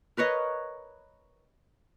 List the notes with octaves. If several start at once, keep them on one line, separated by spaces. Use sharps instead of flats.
A#4 B4 C#5 D#5